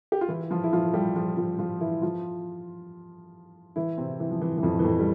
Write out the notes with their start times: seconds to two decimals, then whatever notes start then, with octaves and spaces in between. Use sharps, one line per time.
0.12 G4
0.21 F4
0.28 E3 E4
0.51 F3 F4
0.63 E4
0.73 F3 F4
0.93 G3 G4
1.16 F3 F4
1.37 F3 F4
1.59 F3 F4
1.81 E3 E4
2.02 F3 F4
3.76 E3 E4
3.98 C3 C4
4.20 E3
4.31 F3
4.41 E3
4.57 E3
4.63 F2 F3
4.79 E3
4.84 F2 F3
4.99 G3